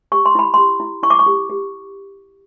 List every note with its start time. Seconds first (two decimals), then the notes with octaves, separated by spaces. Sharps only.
0.12 G4 C#6
0.26 C6
0.35 E4 B5
0.54 G4 C6
0.80 E4
1.03 E4 C#6
1.10 D6
1.19 C#6
1.26 G4
1.49 G4